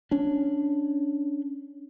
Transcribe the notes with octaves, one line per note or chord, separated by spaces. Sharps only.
C#4 D4